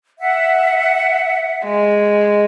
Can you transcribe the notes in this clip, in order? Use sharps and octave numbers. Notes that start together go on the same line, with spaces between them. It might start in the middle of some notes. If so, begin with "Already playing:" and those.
E5 F#5
G#3